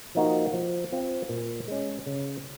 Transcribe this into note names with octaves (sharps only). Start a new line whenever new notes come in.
F3 A#3 D#4 F#4
F3
C4 F4
A#2
G#3 C#4
C#3